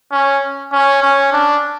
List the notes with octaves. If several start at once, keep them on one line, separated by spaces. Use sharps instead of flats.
C#4
C#4
C#4
D4